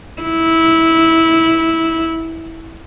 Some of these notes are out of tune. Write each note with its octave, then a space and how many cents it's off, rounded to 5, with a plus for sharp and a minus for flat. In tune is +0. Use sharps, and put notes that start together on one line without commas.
E4 -15